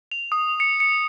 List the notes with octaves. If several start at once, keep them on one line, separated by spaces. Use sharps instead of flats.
F7
D#6
C#7
C#7